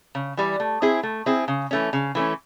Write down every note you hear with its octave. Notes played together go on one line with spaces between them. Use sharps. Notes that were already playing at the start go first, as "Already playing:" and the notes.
C#3
E3 G3
A3
C4 E4 G#4
A3
C4 E4 G#4
C#3
E3 A3 C#4
C#3
E3 A3 C#4